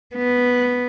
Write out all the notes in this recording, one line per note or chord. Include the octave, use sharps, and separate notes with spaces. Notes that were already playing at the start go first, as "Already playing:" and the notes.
B3